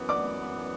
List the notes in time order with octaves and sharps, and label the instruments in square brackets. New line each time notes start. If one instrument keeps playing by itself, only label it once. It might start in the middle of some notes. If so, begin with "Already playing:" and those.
Already playing: [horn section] F#2 E3 B3
[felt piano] D5 D6